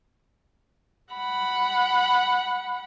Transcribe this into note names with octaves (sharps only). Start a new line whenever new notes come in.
F#5 B5